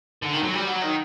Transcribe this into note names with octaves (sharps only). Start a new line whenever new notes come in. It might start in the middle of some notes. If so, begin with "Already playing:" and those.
D3
D#3
F#3
G3
F#3
D#3